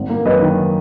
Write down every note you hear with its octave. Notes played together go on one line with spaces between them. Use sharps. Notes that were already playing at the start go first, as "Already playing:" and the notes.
Already playing: G#1
A#3
F#2 B4 D#5
D#3